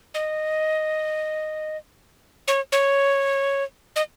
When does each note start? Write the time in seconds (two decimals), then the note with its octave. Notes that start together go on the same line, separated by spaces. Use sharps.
0.14 D#5
2.48 C#5
2.72 C#5
3.96 D#5